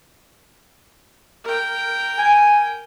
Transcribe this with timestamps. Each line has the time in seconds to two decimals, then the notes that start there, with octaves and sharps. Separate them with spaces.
1.44 A#4 G5
2.19 G#5